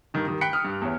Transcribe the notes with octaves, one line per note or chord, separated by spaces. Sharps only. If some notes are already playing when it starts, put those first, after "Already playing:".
G2 D#3
D#3 G3
G5 B5 F#6 B6 C#7 D7
D#6 F6
G2
E2 C#5